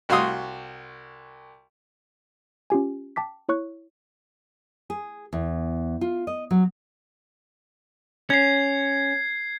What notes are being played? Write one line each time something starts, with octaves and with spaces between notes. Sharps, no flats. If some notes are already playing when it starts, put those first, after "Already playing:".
C2 F#4 F5 C6 D#6
C#4 F4 G4 G#5
G5 A5 D6 B6
E4 C#5 C#6 F#6
G#4
E2
F4
D#5
F#3
C#4 G#6 C7